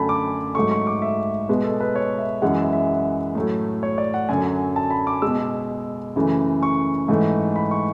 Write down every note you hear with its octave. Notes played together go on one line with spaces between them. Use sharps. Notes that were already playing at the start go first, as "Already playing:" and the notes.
Already playing: F#2 D3 A3 G#5 A5 B5
D6
G#2 F#3 A3 C#6
C#6
D6
E5
B2 G#3 B4
A4
B4
C#5
E5
F#2 E3 G#3 F#5
E5
E5
A2 F#3 A3
C#5
D5
F#5
F#2 D3 F#3 G#5
A5
B5
D6
B2 G#3 E6
F#2 C#3 E3 A3
C#6
G#2 E3 A3
B5
C#6